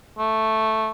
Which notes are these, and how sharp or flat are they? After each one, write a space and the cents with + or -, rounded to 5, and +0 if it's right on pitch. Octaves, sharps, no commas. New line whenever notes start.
A3 +0